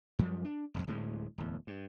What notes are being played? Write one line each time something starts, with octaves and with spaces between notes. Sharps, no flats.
F#2 F3 G3
D4
D1 E2
D1 D2 A2 G#3
D1 E2
G2